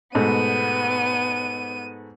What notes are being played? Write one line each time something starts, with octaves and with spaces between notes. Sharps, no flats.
G#2 B2 A3 B3 D#7